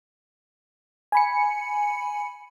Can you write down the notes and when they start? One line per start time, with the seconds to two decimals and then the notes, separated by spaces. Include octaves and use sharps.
1.12 G#5 B5 C#7